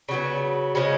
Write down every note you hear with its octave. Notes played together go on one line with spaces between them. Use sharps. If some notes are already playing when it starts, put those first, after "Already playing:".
C#3 F#3 B3
C#3 F3 G#3 C#4